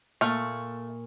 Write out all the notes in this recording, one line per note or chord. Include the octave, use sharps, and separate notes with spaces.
A#2 A3 C#6 F6